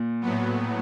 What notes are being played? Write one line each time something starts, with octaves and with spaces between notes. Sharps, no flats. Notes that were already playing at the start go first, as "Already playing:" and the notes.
Already playing: A#2
A2 F#3 B3